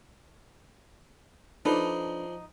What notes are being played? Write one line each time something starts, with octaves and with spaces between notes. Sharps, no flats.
F3 D4 D#4 A4 B4 D5 C6